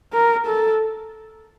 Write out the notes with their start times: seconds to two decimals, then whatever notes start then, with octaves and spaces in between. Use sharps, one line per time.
0.13 A#4
0.47 A4